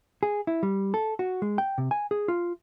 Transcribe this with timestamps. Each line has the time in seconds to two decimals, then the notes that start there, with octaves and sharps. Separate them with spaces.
0.23 G#4
0.47 E4
0.63 G3
0.94 A4
1.19 F#4
1.42 G#3
1.58 G5
1.78 C3
1.91 G#5
2.11 G#4
2.28 F4